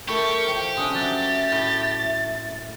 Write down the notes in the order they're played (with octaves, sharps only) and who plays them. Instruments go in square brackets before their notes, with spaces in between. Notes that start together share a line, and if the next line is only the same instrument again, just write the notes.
[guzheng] A3 E4 C#5 [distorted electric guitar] G4 [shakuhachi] A#4 [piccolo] C#6
[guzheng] F3 [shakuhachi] G5
[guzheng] C3 C#4 D4 [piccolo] D#6
[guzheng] F#3 [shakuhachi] E5 [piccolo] A6
[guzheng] A2